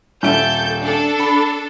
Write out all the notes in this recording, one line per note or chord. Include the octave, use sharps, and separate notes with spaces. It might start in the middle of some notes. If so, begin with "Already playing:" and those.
D#1 A4 E5 G6 D7
D4 A4
B5